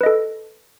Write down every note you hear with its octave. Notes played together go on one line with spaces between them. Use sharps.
A4 B4 D#5